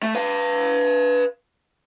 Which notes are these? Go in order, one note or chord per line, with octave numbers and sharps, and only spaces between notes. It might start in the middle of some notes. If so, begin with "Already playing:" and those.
A3
B4 F5